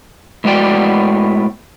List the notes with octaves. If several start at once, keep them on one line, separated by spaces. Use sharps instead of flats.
A2 G#3 B3 F#4 D5 G5